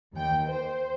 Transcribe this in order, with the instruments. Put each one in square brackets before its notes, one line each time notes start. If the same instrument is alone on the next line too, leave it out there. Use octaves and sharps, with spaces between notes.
[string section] D#2 G5
C5